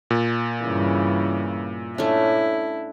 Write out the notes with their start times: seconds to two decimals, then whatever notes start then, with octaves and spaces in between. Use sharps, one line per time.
0.10 A#2
0.63 G2 C#3 E3
1.98 A3 C#4 D4 E4